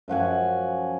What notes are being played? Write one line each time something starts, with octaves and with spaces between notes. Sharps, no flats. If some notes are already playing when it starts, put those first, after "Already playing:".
F#2 F3 F#4 G#5